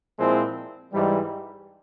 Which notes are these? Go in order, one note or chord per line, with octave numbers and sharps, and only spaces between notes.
A#2 F3 G#3 C4 E4
G#2 E3 G3